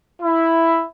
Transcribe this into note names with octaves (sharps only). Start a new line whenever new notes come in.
E4